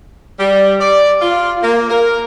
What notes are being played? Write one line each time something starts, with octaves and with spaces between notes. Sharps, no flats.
G3
D5
F4
A#3
A#4